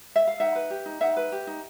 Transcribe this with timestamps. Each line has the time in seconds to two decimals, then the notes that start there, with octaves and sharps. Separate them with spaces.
0.16 E5
0.27 F5
0.40 D#4 E5 F#5
0.55 B4
0.70 G4
0.86 D#4
1.01 D#4 E5 F#5
1.16 B4
1.32 G4
1.47 D#4